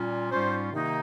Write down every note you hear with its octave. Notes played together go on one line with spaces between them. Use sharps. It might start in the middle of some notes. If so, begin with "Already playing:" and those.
Already playing: A#2 G3 C#4 F4
G#2 G3 C#4 F4 C5
C3 D#3 A#3 D#4